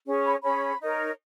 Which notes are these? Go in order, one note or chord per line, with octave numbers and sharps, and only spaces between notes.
C#4 G#4 C#5
B5
C#4 G#4 C#5 B5
D#4 A#4 C#5